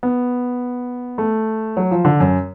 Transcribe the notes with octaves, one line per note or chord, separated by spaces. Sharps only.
B3
A3
F#3
F3
D3
F#2